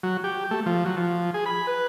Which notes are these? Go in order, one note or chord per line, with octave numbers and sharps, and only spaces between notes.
F#3
G4
A3
F3
F#3
F3
G#4
B5
B4